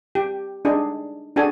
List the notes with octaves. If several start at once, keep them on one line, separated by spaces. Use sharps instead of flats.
G4
D4 D#4 G#4
D4 F#4 G#4 A4 G#5